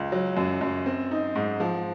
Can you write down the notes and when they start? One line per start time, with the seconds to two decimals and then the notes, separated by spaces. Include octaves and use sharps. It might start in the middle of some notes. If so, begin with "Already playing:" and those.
Already playing: C#2
0.12 F#3
0.37 F#2
0.61 F#2
0.86 C4
1.11 D#4
1.35 G#2
1.60 F3